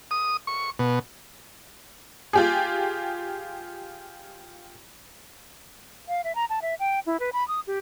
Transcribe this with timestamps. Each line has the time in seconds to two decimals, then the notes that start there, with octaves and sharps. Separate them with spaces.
0.11 D#6
0.47 C#6
0.79 B2
2.33 F4 G4 G#4
6.08 F5
6.24 E5
6.35 A#5
6.50 A5
6.62 E5
6.80 G5
7.06 E4
7.20 B4
7.33 B5
7.48 D#6
7.67 G4